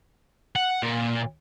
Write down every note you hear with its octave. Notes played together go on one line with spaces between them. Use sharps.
F#5
A#2